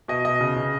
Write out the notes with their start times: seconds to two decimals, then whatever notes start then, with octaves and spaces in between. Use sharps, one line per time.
0.08 B2 D#5
0.25 B2 D#5
0.41 C#3
0.56 C#3